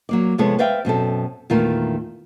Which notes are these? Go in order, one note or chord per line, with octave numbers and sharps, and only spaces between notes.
F#3 A#3 D5
F2 C3 G#3 B3 A4 C#5
B4 C5 D5 E5 F5 G5
F#2 B2 C4 A4
E2 A#2 D#3 A3 F4 A#4